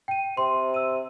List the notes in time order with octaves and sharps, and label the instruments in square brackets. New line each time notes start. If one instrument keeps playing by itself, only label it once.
[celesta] G5 D#7
[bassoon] C3 [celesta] C6
[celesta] E6 D#7